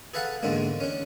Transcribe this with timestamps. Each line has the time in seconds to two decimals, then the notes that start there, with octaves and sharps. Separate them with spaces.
0.14 G#4 A4 B4 F5 F#5 A5
0.43 E2 G#2 D3 G#3 A#3
0.80 C#4 D4